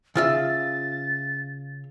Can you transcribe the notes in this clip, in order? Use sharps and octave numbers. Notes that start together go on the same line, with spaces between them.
C#3 F4 E5 A6